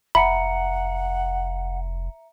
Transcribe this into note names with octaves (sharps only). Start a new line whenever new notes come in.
F1 E5 F#5 A#5 B5 C#7